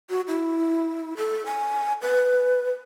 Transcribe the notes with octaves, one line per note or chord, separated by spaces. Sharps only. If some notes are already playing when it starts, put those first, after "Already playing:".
F#4
E4
A4
G#5
B4